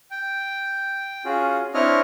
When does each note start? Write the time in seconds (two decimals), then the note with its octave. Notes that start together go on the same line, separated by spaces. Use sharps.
0.11 G5
1.25 C#4 F4 F#4 G#4
1.74 C4 D4 E4 C#5 D#5 F6